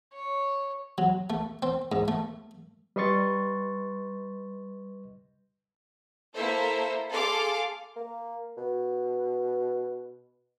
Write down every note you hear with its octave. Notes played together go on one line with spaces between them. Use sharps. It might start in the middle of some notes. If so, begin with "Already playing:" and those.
C#5
F#3
A3
C4
G#2
A3
G3 B4 D#5 C6 C#6 A6
A#3 E4 A4 C5 E5
G#4 A4 F5 C6 D6
A#3
B2